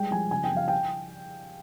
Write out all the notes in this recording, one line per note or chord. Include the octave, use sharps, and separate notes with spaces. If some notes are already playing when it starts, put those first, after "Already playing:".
Already playing: G3 G#3 G5
F3 G#5
C#3 G#5
G5
F3
F5
G5